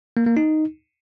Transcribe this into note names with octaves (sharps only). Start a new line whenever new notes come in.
A#3
A#3
D#4